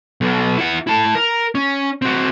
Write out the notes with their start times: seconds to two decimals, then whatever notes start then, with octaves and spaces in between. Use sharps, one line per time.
0.21 B1 B2
0.58 E4 F#5
0.87 E4 A5
1.15 A#4
1.55 C#4
2.02 C4 F#4